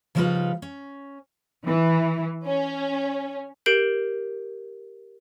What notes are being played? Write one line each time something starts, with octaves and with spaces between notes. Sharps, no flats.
C#3 F3 G3 D#4 F4 B4
C#4
E3
C#4
G4 A#4 G6 C7 D7 F#7